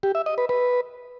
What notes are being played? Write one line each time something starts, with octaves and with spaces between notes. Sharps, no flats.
G4
E5
D#5
B4
B4